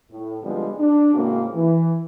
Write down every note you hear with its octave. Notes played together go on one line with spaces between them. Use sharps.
A2
D3 F3 G3 G#3 B3 C4
D4
A2 C#3 G#3 A#3 C4 F#4
E3